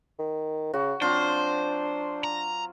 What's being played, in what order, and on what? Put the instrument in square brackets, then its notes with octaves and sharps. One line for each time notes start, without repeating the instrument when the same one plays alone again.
[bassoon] D#3
[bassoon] C#3 [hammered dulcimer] F#4
[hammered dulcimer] F#3 C4 F4 [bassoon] D4 [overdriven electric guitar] C5
[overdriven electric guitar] A#5